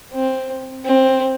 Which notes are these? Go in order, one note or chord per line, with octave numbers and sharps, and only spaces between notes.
C4
C4